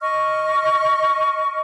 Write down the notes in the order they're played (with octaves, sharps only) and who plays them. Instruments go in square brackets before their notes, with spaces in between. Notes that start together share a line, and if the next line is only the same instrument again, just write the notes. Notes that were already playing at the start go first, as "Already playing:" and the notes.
[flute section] D#5 C#6 F6